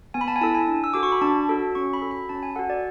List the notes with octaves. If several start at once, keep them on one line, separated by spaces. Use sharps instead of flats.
B3 G#5
B5
A5
G#5
E4 A4 A5
G#5
D4
E6
F#4 A4 D6
C#6
B5
D4 A5
F#4 A4
C#4 C#6
B5
F#4 A4
B5
C#4 A5
G#5
F#4 A4 F#5
D5